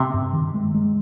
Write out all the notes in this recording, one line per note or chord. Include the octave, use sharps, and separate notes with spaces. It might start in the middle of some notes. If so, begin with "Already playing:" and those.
Already playing: C3
G2
D#3
G#3
G#3